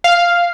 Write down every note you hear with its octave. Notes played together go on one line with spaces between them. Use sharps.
F5